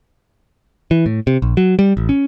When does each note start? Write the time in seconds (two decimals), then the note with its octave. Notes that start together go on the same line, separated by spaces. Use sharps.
0.91 E3
1.06 A2
1.27 C3
1.42 A#1
1.57 F#3
1.79 G3
1.97 A1
2.09 C#4